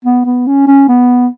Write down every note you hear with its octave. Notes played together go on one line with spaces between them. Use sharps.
B3
B3
C#4
C#4
B3